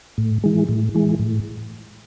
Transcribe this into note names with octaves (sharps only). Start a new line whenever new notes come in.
A2
E3 G#3
A2
E3 G#3
A2